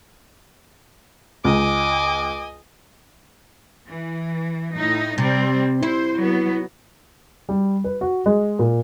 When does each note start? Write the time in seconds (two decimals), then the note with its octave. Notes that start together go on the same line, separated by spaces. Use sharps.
1.45 C#2 D#5 G#5 D6
3.88 E3
4.75 A2 D#4
5.18 C3 G3 C4
5.83 E4 C5
6.17 F#3 B3
7.49 G3
7.84 B4
8.01 F#4
8.26 G#3
8.59 A#2